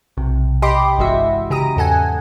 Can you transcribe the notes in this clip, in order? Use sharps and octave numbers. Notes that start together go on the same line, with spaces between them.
B1 C3
G4 D#5 G5 B5 C6 D6
G1 E3 G#3 F#4 E5
C#3 G4 A#5 D#6
E2 G#2 A4 F#5 G#5